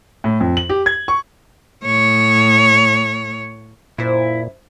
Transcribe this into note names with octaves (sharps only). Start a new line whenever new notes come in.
A2
F2
F#7
G4
G#6
C#6
A2 C#5
F#2 A#2 E4 C5 E5